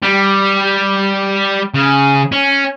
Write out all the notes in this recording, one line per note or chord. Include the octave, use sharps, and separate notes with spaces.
G3
C#3
C#4